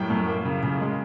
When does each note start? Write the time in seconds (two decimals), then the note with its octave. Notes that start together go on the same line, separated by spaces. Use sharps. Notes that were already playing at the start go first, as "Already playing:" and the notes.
Already playing: F#2 A2 G3 G5
0.10 F#2
0.28 A#3
0.45 C#3
0.63 C#3
0.80 G#3